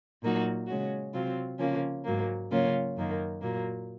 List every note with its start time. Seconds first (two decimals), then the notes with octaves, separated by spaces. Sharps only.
0.22 A#2 F#3 A#3 D#4 F#4
0.68 C#3 G#3 C#4 F#4
1.14 C3 F#3 C4 F4
1.59 C#3 F3 A#3 C#4
2.05 G#2 F#3 A#3
2.51 C#3 F#3 A#3 C#4 F4
2.97 F#2 D#3 A#3
3.42 A#2 F#3 A#3